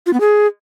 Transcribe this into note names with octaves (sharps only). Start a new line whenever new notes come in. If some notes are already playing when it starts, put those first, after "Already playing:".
F4
B3
G#4